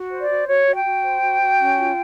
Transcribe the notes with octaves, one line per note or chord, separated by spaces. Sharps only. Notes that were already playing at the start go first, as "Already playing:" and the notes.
Already playing: F#4
C5
D5
F#4
F#4 C#5
F#4
G5
F#4
C5
F#4
F#4
C#4
F4